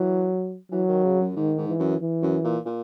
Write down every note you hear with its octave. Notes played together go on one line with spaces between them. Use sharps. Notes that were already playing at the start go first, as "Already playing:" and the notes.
Already playing: E3 F#3
E3 F#3
D#3
C#3
F#2
G#2 D#3
G#2
E3
F#2
E3
F#2
A#2
A#2